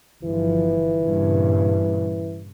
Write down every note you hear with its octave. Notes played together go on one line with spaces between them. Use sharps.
G1 E3 F3
G2 A#2 C#3